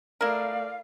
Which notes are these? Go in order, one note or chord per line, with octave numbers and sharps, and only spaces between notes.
A3 E4 A#4 D5 F5